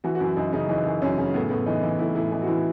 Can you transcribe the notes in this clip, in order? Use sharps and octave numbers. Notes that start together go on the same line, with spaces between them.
E3 F#4
F#4
F#2 E4
F#2 D#4
C#3 D#4
E3 D#4
F#2
F#2 C#4
C#3
A2 B3
A2 B3
E3 D#4
E3 E4
A2 E4
A2 E4
E3 D#4
F#4
E3 E4